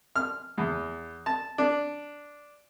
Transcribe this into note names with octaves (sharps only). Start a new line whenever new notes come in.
F6
E2
A5
D4